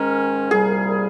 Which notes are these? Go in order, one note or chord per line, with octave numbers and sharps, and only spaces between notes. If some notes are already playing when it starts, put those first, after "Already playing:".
Already playing: G#2 D#3 G#3 C#4 A#4
C2 A#2 G3 G#4